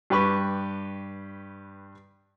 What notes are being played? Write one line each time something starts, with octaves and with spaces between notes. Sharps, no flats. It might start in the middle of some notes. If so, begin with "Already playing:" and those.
G2 G4 B4 C#6